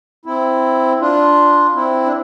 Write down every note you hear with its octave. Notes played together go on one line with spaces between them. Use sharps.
C4 E4
D4 F4
C4 E4
D4